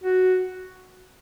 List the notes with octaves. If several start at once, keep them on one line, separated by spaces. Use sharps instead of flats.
F#4